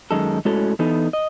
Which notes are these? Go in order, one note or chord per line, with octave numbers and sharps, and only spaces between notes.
F#2 D#3 G#3 D#4 A4
A2 G#3 C#4 F#4 A4
E3 B3 D#4 A4
D#5